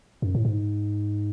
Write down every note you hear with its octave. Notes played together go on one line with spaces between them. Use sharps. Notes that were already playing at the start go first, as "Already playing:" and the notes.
F#2
A2
G#2